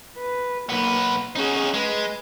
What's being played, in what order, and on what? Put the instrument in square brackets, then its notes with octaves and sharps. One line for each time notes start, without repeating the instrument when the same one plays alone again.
[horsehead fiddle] B4
[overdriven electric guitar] B1 B3 [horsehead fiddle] A#3
[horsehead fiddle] C#4 G#4 [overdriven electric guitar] D#4 F#4
[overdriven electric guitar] G#3 [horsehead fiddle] B4